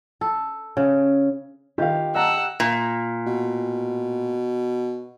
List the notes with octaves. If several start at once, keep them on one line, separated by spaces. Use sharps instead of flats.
A4
C#3
D#3 F4 G4 F5
D#5 F#5 A5 A#5 E6
A#2
B2